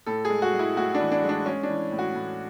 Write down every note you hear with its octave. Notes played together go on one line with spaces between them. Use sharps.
A2 A4
G#4
G#3
F#4
G#3
E4
A2 F#4
D4
E3
D4
G#3
D4
G#3 C#4
D4
E3
A2
F#4
A2